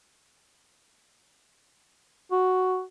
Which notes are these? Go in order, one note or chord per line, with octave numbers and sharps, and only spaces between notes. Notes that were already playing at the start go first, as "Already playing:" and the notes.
F#4